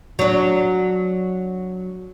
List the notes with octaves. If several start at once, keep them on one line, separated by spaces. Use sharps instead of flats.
F#3 D4